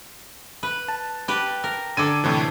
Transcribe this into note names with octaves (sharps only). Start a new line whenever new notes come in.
B4
A5
G4 B4
A#4
D3 A4 D6 G#6 D#7
A2 C3 E3